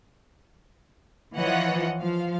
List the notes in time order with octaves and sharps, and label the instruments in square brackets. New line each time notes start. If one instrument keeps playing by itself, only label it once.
[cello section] E3 F3 [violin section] C#5 D#5 F#5
[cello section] F3 [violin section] F5